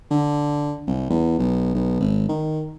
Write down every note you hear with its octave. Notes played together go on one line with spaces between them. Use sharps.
D3
C2
E2
B1
B1
G#1
D#3